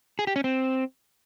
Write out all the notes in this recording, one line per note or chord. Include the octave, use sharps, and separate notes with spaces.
G#4
G4
C#4
C4